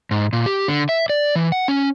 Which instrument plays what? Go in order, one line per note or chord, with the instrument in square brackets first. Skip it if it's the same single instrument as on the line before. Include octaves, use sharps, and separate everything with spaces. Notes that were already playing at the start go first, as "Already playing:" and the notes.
[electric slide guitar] G#2
A#2
G4
D3
E5
D5
E3
F#5
C#4